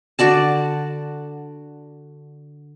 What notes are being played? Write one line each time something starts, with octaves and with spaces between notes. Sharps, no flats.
D3 F#4 D5 A5